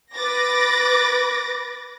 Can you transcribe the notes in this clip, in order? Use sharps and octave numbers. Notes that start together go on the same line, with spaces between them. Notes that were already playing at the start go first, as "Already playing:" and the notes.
B4 D6 A6 A#6